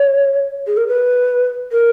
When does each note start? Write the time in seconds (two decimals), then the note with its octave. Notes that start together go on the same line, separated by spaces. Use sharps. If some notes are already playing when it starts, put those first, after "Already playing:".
Already playing: C#5
0.67 G#4
0.77 A#4
0.88 B4
1.72 A#4